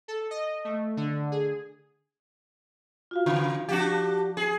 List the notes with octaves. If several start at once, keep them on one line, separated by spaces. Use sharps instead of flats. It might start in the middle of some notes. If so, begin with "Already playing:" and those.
A4
D#5
A3
D3
G#4
F4 F#4 F5
C#3
F3 D4 F#4 G4
G#4